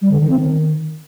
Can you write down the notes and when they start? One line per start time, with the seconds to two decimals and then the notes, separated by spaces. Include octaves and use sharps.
0.02 G3
0.11 D3
0.21 D#3
0.30 C4
0.40 D#3